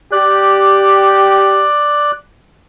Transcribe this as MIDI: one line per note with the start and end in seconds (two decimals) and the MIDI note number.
0.12 1.65 67
0.12 2.12 74
0.12 2.12 90